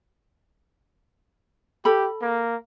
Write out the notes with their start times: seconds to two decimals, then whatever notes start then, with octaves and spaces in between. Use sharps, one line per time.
1.85 G4 A4 B5
2.21 A#3